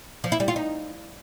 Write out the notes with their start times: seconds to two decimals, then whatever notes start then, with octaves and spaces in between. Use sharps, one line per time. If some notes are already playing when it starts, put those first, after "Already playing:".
0.24 F3
0.32 E4
0.40 G3
0.48 F4
0.56 D#4